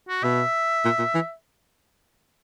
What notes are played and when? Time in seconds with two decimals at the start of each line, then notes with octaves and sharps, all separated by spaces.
0.08 F#4
0.23 B2 E5
0.85 A#2
0.99 A#2
1.14 E3